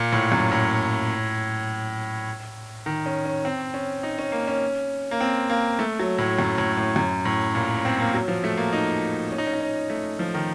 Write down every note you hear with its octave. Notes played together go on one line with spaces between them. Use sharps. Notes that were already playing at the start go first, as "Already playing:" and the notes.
Already playing: A#2
A2
F#2
A2
D#3
C#4
C#4
C4
C#4
D#4
C#4
A#3
C#4
A#3
C4
A#3
A3
F#3
A2
F#2
A2
A2
F#2
A2
A#2
C4
A#3
F#3
F3
A3
A#3
D#4
C#4
D#4
C#4
D#4
C#4
A3
F3
D#3